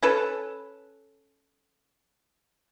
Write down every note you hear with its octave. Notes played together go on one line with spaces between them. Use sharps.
C#4 A4 B4